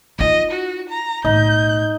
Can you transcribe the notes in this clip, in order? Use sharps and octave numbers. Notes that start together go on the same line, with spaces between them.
D#4 F4 D#5
F#4
A#5
B1 A2 D#4 G6